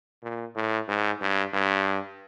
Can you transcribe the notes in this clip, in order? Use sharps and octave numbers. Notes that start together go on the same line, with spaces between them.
A#2
A2
G#2
G2
G2